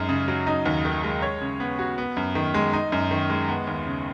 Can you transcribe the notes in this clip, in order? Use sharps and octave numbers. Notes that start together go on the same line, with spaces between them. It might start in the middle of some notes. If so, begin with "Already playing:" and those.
Already playing: F#2 G#3 D#4
C#3
F#3
D#4
D#2
D#3
G#3
C#5
C#3
B3
F#4
B3
F#2
D#3
G#3
D#4
F#2
D#3
G#3
B3
D#2
C#3